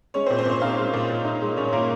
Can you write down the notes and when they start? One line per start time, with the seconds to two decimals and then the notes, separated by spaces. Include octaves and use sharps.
0.14 G#3 C#4 C#5
0.26 C4 C5
0.30 A#2
0.38 C4 C5
0.46 A#2 C#4 C#5
0.61 D#4 F4 F5
0.78 G#3
0.93 A#2
1.10 A#2
1.25 D#4
1.41 G#3
1.57 A#2 C#4 C#5
1.73 A#2 A#3 A#4